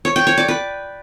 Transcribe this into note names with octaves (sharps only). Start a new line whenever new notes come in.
C#5
G5
C#5
D5
B4